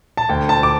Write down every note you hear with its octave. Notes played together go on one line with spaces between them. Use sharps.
A5
D2 G5
A5
D6